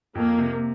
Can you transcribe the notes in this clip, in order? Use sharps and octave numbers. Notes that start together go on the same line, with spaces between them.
F2 A#3
C3